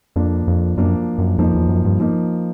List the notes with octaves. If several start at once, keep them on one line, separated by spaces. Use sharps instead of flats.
F2 F3 A#3 D4
F2
F#2 F3 A#3 D4
F#2
F2 F3 A#3 D#4
E2
F#2
G2
F3 A#3 D#4